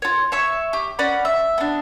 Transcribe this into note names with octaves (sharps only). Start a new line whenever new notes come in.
F4 C#5
C#5 E5 C#6
G4
C#4 D5 F#5 B5
E5
B3 D4